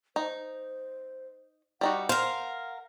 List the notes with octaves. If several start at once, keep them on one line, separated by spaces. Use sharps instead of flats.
D#4 C5
G3 D#4 F#4 F#5
A#4 C5 F5